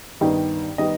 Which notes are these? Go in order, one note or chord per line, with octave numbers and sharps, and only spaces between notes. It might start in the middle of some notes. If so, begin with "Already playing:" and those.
G2 D#3 G3 B3 D#4
D#3 G3 B3 D#4 D#5